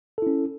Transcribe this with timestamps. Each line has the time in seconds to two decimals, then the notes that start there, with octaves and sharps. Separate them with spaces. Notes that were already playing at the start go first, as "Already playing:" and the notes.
0.18 A4
0.22 E4
0.27 C#4